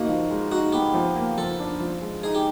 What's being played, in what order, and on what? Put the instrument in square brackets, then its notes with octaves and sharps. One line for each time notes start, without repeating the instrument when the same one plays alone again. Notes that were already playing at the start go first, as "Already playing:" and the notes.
Already playing: [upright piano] A#3 D#4 [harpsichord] F#4
[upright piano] F3
G#3
[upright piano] D#4 [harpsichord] F#4
[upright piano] B3 [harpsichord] G4
[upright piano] F3
A#3
[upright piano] F3 [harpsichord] A4
[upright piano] D4
F3
G#3
[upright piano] D#4 [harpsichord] G#4
[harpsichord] G4